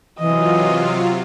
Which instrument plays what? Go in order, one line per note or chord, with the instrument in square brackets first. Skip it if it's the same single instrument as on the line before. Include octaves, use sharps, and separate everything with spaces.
[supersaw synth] C3 F#3 F4 [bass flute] E3 [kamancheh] D#5